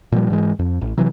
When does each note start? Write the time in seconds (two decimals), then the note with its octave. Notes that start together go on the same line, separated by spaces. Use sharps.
0.12 A#2 F3 G3
0.30 G#2 E3 G#3
0.59 F2
0.81 A1
0.98 C3 E3 F#3